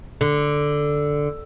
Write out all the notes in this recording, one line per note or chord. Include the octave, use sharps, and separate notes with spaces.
D3